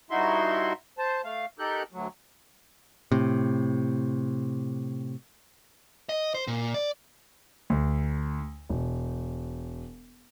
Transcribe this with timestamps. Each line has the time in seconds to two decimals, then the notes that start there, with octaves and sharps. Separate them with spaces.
0.11 G2 D#4 E4 F#4 E5 C6
0.98 C5 A5
1.24 A3 F5
1.59 D#4 G4 A4 A#4 F#6 G6
1.92 D2 F#3
3.12 A2 C3
6.09 D#5
6.34 C5
6.47 A#2
6.74 D5
7.70 D2
8.70 E1